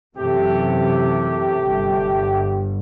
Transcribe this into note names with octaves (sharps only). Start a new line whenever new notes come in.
F#2 C3 E3 A3 G4
G1